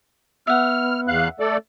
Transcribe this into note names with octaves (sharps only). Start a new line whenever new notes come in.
B3 E5 F#5 F6
E2 F5 F#6
A3 A4 D5